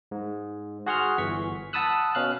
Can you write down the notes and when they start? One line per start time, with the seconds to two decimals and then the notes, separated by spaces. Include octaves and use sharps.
0.11 G#2
0.86 F#4 G#4 F#5 C6 C#6 F6
1.18 G1 E3 C#6 B6
1.73 F#5 A5 B5 D#6 E6 F#6
2.15 B2 C#4 F5 F#6